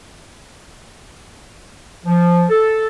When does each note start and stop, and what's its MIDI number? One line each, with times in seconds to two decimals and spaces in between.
2.05 2.44 53
2.49 2.86 69